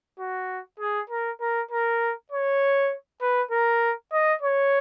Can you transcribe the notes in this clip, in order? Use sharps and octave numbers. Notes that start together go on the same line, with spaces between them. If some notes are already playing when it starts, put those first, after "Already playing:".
F#4
G#4
A#4
A#4
A#4
C#5
B4
A#4
D#5
C#5